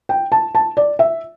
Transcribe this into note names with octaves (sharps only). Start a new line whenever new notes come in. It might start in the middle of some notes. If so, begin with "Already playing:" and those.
G5
A5
A5
D5
E5